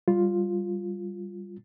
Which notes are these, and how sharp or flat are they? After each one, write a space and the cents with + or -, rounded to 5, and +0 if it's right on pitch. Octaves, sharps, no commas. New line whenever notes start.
G3 +0 F4 +0